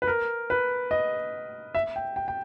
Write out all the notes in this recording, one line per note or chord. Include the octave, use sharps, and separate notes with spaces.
B4
A#4
B4
D#5
E5
G5
G5
G5